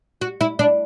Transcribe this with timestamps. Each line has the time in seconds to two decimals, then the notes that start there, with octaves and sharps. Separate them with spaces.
0.21 F#4
0.41 E4
0.59 D4